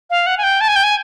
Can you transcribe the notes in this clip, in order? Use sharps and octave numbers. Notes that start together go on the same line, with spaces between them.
F5
F#5
G#5
G5
A5
G#5
G5
G#5